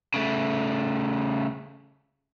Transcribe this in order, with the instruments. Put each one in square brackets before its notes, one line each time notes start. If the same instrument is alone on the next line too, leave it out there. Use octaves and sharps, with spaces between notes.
[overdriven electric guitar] C#3 A3